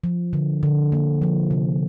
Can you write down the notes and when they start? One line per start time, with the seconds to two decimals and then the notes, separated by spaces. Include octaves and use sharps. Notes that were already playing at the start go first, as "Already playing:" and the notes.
0.04 F3
0.33 D3
0.63 D3
0.92 A#3
1.22 F3
1.51 C3